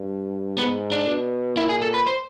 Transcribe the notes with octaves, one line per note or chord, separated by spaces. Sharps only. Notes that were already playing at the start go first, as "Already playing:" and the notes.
Already playing: G2
G#2 B3
D4
B2
A#2 E4
G#4
A4
B4
C5